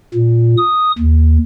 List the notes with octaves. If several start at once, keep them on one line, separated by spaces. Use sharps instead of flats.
A#2
D#6
D#2